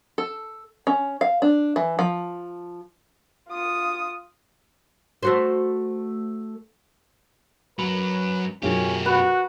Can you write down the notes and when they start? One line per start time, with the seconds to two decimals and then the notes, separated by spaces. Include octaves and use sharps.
0.18 A4
0.87 C#4
1.21 F5
1.42 D4
1.76 E3
1.99 F3
3.49 F4 D#6
5.23 A3 F#4 C5
7.79 F#2 F#3 B4 B5
8.63 F#2 B2 C#4 F4 G4 G#4
9.06 F#4 B4